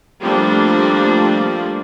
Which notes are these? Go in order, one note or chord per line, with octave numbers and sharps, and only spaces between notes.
F3 G3 A3 A#3 C4 D4